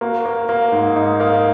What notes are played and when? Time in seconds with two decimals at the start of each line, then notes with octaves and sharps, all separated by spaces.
0.01 A#3 F#4
0.26 A#3
0.49 A#3
0.72 G#2
0.96 G#2 D#4
1.20 A#3